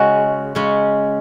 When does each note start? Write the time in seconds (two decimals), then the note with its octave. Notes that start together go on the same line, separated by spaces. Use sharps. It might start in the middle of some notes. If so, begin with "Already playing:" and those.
Already playing: C#3 G#3 C#4 F#4
0.55 C#3 G#3 C#4